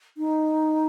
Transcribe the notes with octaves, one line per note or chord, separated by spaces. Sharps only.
D#4